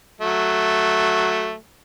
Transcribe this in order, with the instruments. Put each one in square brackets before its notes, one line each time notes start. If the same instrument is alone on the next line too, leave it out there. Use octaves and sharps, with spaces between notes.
[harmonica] F#3 A3